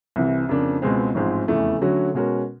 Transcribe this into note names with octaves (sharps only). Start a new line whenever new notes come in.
C2 C3 E3
F2 C#3 F3 A#3 D4
C#2 B2 G#3 C4
A1 G#2 F3 G#3 C4
F1 E2 C#3 E3 A3
D3 F#3 A3 C#4 F#4
B2 G#3 C#4 F#4 A#4